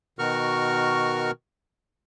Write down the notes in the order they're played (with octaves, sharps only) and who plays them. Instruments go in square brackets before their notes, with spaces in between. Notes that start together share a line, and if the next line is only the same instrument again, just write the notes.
[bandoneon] B2 D#3 F#4 A#4 C#6 F6